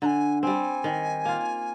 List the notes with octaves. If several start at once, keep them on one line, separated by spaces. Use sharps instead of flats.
D3 G#5 A#5
G3 C4 G#5
D#3
A#3 F4